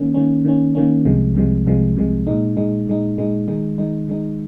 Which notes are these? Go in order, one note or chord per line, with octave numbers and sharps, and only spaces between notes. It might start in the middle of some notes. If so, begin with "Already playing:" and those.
Already playing: D#3 A#3 C#4
D#3 A#3 C#4
D#3 A#3 C#4
D#3 A#3 C#4
C2 C3 F3 G#3
C2 C3 F3 G#3
C2 C3 F3 G#3
C2 C3 F3 G#3
A#2 G#3 D#4
A#2 G#3 D#4
A#2 G#3 D#4
A#2 G#3 D#4
D#3 G#3 D#4
D#3 G#3 D#4
D#3 G#3 D#4